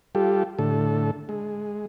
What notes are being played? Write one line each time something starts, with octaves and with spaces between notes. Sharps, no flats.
G3 F4 G4 A4
A2 D3 A4
G#3